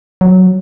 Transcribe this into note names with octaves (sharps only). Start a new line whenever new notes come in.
F#3